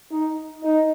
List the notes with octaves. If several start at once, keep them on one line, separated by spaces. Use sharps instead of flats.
D#4
D#4